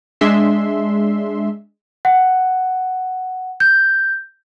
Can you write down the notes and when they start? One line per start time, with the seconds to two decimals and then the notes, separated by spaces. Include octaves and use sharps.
0.21 G#3 D4 E5 C6
2.05 F#5
3.60 G6